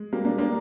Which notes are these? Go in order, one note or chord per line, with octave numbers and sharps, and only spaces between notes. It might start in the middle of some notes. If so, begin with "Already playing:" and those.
Already playing: G#3
G3 A#3
A#3 D4
A#3 D4